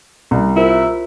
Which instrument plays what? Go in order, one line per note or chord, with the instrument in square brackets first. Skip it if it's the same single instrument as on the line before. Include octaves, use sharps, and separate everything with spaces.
[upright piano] C2
[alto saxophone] E4 [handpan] F4 A#4 C5